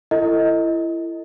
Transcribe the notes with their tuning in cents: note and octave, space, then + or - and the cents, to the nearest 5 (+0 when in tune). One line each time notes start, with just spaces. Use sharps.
E4 +25 A4 +35 D#5 +15